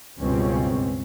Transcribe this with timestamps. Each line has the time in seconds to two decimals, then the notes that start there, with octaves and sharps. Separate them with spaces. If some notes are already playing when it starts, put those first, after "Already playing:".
0.20 C#2 G2 B2 C4 C#4